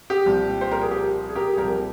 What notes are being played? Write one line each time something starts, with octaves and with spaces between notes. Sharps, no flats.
G4
C2 A#2 F3
C5
A#4
G#4
G4
G#4
G4 A#4
G#4
C2 A#2 F3 G4 A#4